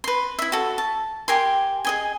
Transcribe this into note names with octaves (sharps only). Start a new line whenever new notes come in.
B4 C6
E4 E5
F#4 A4
A5
G4 A#4 G#5 C6
G#4 D#5 G#5